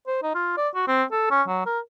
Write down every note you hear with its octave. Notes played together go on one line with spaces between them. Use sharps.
C5
D#4
F4
D5
F#4
C4
A4
C#4
F#3
A#4